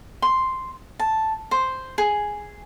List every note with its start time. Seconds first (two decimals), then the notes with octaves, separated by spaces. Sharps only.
0.22 C6
0.99 A5
1.51 C5
1.98 G#4